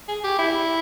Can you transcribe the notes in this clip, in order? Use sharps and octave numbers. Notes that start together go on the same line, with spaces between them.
G#4
G4
E4